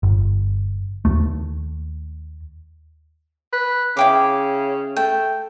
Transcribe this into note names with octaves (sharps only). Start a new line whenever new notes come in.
G1
D#2 A3
B4
C#3 E4 G5 D6
A3 G5